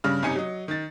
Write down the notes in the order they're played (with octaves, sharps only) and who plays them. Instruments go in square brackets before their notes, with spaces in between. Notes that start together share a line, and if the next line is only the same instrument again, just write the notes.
[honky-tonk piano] G2 C#3 F6
G1 C3 D#4 G#5 C#7
F#3 D#5
D#3 A6